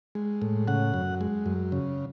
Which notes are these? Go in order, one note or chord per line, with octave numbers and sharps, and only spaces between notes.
G#3
A2
C#3 F#5
F#2
G#3
F#2
C#3